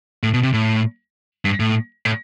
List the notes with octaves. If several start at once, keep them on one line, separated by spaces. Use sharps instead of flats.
A2
B2
C3
A2
G2
A2
A2